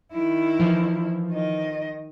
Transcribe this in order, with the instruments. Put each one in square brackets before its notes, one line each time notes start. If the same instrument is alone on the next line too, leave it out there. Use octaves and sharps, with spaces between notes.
[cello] D#3 E4
[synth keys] E3 F3
[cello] D#3 D#5